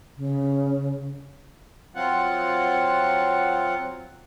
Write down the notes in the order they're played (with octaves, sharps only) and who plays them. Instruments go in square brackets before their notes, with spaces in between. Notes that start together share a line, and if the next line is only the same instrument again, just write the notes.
[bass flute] C#3
[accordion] F#3 C4 F4 F#5